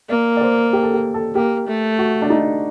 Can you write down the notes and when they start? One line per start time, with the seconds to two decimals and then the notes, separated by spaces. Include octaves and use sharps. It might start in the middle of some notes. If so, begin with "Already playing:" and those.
0.09 A#3 D5
0.37 D5
0.41 C5
0.73 G4
0.83 A4
0.94 G4
1.14 A4
1.35 A#3 G4
1.68 A3
1.99 F#4
2.22 D4
2.30 D#4